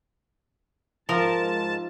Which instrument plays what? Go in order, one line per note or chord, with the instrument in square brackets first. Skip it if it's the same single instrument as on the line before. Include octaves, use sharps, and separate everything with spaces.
[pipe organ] G#2 A5 [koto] F3 A#4